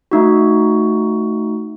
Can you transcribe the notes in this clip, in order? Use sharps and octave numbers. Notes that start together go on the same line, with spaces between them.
A3 D#4 F#4